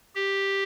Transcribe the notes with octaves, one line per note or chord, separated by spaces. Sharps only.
G4